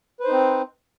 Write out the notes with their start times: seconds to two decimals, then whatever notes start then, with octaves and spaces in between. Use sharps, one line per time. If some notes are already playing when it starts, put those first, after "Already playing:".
0.20 B4
0.24 C5
0.28 D#4
0.32 C4